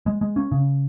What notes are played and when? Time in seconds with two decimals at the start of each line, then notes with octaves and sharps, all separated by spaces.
0.06 G#3
0.21 G#3
0.36 C#4
0.51 C#3